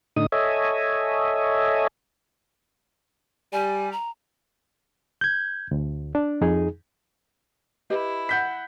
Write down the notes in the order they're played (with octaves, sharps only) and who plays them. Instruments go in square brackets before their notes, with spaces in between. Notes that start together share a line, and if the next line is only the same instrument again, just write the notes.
[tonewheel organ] A2 D3 D#4 D#6
A4 C#5 D#5 E5 G#5
[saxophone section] G3 [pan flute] G#5
[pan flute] A#5
[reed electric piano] G6 G#6
D2
D4
F2 D#4 G#4
[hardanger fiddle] E4 [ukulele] G4 B4 D#5
[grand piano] F#5 G6 B6